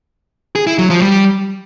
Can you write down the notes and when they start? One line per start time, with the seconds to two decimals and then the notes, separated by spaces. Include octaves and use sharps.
0.55 G#4
0.67 E4
0.78 F#3
0.90 F3
1.01 G3